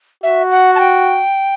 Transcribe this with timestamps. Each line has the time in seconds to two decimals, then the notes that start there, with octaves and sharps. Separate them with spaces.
0.23 F#4 E5
0.51 F#5
0.75 A5
0.80 G5